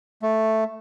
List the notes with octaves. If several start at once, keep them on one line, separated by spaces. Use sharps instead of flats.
A3